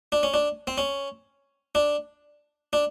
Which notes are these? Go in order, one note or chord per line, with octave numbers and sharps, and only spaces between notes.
D4
C#4
D4
C4
C#4
D4
D4